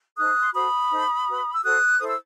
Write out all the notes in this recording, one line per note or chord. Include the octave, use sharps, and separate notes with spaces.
D#4 A4 C5 D#6 F#6
C6
F#4 A4 C5 B5 D#6
D#4 A4 C5
F#4 B4
E6
F#4 A4 C5 D#6 F#6
E4 A4 C5 D#6
E6